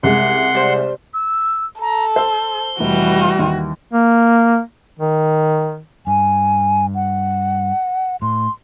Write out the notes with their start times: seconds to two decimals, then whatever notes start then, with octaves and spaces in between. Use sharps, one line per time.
0.03 C2 G#3 F#5 C6
0.54 G3 C5
1.14 E6
1.81 A4 A#5
2.16 C5 E6 G7
2.80 F1 E3 G3 F#4
3.39 D#2 G5
3.93 A#3
4.99 D#3
6.07 G2 G#5
6.95 F#5
8.22 A2 C6